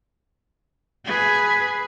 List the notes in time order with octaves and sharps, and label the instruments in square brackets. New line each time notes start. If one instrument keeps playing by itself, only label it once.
[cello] G#4 B4